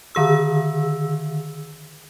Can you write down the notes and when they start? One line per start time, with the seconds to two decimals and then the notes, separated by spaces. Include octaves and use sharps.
0.15 D3 D#3 G#4 E6